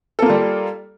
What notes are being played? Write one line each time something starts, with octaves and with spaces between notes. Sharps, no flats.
G3 A#3 F4 A4